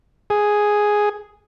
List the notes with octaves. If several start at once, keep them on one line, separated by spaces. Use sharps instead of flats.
G#4